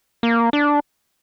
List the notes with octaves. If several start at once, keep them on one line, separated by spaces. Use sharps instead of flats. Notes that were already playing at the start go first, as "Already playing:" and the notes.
A#3
D4